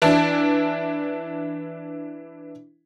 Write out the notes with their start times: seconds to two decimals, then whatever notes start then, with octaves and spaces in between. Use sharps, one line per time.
0.02 E3 D4 E4